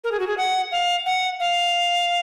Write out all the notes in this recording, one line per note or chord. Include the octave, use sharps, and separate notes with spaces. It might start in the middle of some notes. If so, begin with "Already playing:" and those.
A#4
G#4
F#4
G#4
F#5
F5
F#5
F5